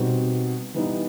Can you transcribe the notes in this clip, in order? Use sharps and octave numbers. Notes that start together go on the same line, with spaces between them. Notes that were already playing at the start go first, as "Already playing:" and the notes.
Already playing: B2 G3 C4 D#4 F#4
E3 G3 B3 D#4